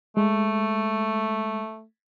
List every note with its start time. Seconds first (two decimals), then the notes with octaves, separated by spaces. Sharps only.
0.17 G#3 A3